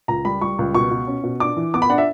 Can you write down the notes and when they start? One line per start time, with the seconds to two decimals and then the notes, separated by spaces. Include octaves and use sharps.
0.08 C#2 A#5
0.25 G3 B5
0.41 G3 C#6
0.59 C#2
0.74 B2 C#6
0.91 B2
1.07 C#4
1.23 B2
1.40 D4 D6
1.57 E3
1.74 B3 D6
1.82 B5
1.90 D4 F#5
1.98 E5